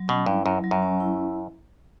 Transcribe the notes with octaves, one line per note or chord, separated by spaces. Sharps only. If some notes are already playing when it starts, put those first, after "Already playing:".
Already playing: F#3
B2 C#4
G2 E4
F#2 F#3
F#3
F#2
C#4
E4